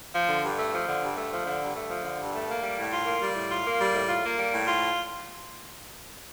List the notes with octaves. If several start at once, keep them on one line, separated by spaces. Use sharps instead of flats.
F3
D3
G2
A3
F3
D3
G2
A3
F3
D3
G2
A3
F3
D3
G2
A3
A#3
G3
A2
F4
A#3
G3
A2
F4
A#3
G3
A2
F4
A#3
G3
A2
F4